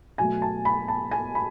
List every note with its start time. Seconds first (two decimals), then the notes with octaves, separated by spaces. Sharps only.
0.18 B2 F#3 A3 G#5
0.42 A5
0.65 B5
0.88 A5
1.11 G#5
1.35 B5